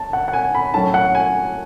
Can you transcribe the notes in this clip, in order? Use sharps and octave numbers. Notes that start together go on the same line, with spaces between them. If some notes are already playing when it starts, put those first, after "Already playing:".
Already playing: A5
F#5
F#5
G#5
B5
A2 F#3 C#4 A5
F#5
G#5